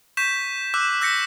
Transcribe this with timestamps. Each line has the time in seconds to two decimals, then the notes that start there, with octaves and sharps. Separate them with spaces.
0.17 C#6 G6 B6 E7
0.74 D6 E6 F#6
1.01 E6 G6 A#6 B6 C#7